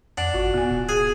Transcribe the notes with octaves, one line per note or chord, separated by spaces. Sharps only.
F2 D4 F#5
G#1 F4 F#4
B2 B3 G#5
D1
G#4